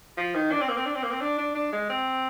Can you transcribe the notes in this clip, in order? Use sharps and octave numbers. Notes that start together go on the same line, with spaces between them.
F3
D#3
D4
C4
A#3
C4
D4
C4
A#3
C4
D4
D4
D4
G#3
C4